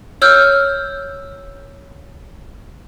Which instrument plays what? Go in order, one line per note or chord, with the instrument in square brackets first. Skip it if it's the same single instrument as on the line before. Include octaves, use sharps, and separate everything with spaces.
[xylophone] C#5 E6 F6 G6